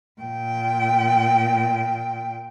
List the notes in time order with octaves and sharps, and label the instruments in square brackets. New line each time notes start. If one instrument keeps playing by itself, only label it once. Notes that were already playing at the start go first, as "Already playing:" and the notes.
[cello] A#2 G5